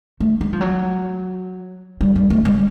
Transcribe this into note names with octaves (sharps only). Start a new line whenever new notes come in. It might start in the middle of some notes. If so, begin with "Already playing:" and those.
A3
G#3
F3
F#3
G3
G3
A3
G#3